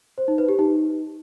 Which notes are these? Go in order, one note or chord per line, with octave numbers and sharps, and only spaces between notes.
C5
D#4
B4
G4
D#4